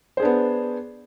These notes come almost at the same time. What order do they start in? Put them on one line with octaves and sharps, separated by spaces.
C5 G#4 D4 B3